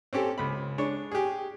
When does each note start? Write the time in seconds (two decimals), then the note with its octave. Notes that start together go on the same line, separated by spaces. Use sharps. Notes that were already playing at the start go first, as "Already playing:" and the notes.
0.13 C4 C#4 G4 A4
0.38 C#2 B5
0.78 G#3 D4 C#5
1.12 G4 G#4